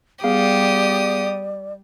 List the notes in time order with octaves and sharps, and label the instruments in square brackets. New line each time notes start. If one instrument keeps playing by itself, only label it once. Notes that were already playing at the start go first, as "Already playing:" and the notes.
[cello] G3 [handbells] B3 G#4 F5 [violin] G4 D#6 [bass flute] D5